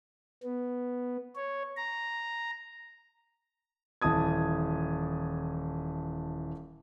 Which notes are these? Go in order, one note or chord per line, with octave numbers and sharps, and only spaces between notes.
B3
C#5
A#5
D#1 E3 A5 D#6 G#6